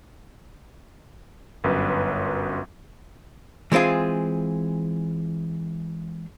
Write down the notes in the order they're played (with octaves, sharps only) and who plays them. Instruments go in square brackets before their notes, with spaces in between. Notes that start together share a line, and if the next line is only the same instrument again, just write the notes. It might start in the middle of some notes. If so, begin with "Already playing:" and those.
[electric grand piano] G1 F#2 B4
[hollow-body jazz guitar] E3 G#3 C4 F4 G#4